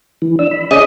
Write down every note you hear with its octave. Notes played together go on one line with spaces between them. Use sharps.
E3
D4 E6
B5
C#4 G#4 D5 D#5